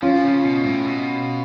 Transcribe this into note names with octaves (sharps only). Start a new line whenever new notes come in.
F3 C#4 F4
C#3
B2
G#2
A2
B2